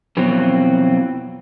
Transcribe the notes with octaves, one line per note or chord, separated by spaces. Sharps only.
F2 B2 E3 F#3 C4